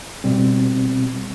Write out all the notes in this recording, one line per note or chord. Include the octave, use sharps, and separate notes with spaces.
B2 G3 C4